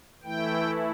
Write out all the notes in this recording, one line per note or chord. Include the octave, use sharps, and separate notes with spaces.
E3 A3 E4 G5